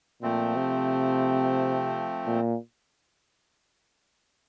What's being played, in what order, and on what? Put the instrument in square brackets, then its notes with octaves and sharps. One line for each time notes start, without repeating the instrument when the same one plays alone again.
[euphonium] A#2 [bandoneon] F3 A3 C4
[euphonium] C3
A#2